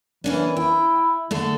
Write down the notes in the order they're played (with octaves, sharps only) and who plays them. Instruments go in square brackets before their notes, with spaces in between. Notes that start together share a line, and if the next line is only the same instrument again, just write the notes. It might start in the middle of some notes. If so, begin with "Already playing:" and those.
[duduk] E3 [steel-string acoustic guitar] A#3 C#4 D4
[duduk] E4 [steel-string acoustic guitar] G5
[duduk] D3 [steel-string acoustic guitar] A3 G#4 A4